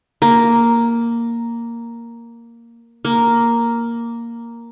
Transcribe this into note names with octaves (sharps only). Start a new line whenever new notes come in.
A#3
A#3